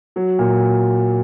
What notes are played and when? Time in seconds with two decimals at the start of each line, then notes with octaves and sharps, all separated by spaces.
0.16 F#3
0.39 A#2